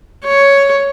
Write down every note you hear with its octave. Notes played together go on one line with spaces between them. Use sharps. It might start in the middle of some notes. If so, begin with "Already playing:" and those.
C#5